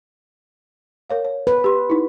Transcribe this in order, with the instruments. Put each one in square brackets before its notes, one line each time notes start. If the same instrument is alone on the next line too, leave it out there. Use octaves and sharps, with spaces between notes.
[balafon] A#4 C#5 F5
C#5
[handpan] B4
[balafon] G4 C6
D#4 E4